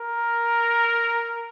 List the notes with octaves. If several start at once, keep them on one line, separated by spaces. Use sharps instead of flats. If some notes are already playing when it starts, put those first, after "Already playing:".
Already playing: A#4